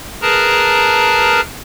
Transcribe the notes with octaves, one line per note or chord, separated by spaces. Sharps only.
G#4 A#4 B4 A5 A#5 F6